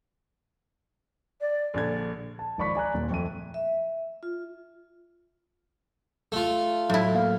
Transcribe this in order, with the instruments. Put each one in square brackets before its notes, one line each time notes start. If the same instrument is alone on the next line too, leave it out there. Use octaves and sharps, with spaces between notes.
[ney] D5
[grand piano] A#1 D3 G#6 [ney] D5
[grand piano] A5
G#1 F3 D5 B5 C#6 B6
D5 G#5 A#5 F#6
D#1 A#2
F2 A3 D#7
[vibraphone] E5
F4
[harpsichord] A3 F4
[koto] A2 E4 [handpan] F#3
[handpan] F#3 A#3 F5